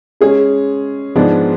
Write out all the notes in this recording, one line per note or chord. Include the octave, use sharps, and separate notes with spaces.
G#3 C#4 G#4
G#2 F3 G#3 B3 D4